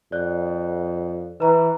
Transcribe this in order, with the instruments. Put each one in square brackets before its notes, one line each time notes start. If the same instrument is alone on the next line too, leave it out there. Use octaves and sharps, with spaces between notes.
[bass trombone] F2 [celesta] D5 F#6
[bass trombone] E3 [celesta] B4 A#5